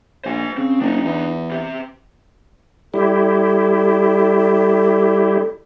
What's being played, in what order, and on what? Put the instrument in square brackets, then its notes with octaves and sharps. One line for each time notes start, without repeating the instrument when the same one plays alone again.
[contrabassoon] A#1 [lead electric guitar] C5 G#5
[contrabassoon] C#3 [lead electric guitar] C4
[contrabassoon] F#1 [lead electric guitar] D4 D#4
[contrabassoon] E2
[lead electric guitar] C3 G4
[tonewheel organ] G3 E4 G4 [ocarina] A4